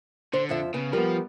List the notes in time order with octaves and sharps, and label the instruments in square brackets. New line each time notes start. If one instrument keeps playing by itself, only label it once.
[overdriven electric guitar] D3 [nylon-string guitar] C5
[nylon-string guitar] F2 F3 E5
[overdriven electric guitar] C#3 [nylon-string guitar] B3
[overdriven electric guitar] F3 [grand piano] G3 B3 [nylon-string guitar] A#4